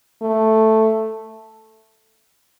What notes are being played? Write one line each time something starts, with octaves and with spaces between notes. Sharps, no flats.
A3